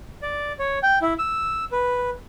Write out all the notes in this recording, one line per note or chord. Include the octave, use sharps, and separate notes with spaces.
D5
C#5
G5
E4
E6
B4